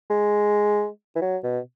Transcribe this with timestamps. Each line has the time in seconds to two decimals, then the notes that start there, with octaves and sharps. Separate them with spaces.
0.10 G#3
1.16 E3
1.22 F#3
1.44 B2